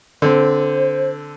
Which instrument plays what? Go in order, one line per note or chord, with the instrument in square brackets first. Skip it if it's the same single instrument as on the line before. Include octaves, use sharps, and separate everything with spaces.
[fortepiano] D3 C4 [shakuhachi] C5